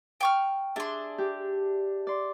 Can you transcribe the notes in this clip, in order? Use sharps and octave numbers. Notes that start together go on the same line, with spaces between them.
G5 C#6 F6
D4 G#4 E5 C6
G4
D5 C6